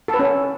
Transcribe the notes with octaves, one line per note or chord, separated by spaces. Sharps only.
A4
B4
C#4